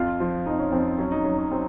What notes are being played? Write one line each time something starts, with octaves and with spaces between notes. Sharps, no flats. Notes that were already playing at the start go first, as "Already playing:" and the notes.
Already playing: F2 F4
F3
F2 D#4
C#4
F2 C4
F#3 C#4
D#4
F#3 C#4
C#4
F#3 C4